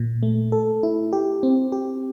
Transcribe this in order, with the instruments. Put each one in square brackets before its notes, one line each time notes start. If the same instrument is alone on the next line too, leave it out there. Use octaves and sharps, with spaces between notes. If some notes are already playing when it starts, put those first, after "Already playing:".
Already playing: [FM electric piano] A#2
A3
A4
E4
G4
C4
G4